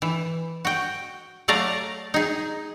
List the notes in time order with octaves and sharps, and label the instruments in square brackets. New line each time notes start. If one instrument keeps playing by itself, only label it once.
[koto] E3
F#4 G5
F#3 A3 D5 F5 A#5
D#4 G#4